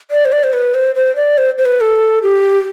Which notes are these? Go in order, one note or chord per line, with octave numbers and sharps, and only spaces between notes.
D5
C5
D5
C5
B4
C5
C5
D5
C5
C5
B4
A4
G4